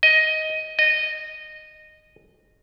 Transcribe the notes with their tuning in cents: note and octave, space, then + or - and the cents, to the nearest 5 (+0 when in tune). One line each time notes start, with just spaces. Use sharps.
D#5 +10
D#5 -15